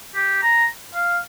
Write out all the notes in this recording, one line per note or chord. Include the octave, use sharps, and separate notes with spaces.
G4
A#5
F5